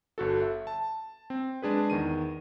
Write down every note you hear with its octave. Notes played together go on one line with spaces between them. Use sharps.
G1 F#4 A4
E5
A5
C4
G#3 D4 G#4 B4
E2 D#3 D#7